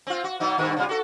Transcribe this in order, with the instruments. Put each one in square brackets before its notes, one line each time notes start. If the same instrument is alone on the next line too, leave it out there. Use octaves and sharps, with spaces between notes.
[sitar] C4 F4
F#4
B2 F#3 D#4
G2 B2 D#3
C3 G3 F4
F#4 A4